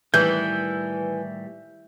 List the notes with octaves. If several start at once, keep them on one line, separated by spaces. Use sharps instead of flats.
A2 D#3 E3 G3 G6